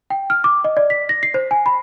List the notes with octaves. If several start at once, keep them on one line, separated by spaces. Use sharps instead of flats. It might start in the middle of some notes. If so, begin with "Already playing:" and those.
G5
F6
D6
D#5
D5
B6
A#6
C7
C5
G#5
B5